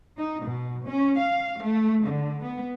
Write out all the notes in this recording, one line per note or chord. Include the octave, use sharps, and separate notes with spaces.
D#4
B2
C#4
F5
A3
D3
B3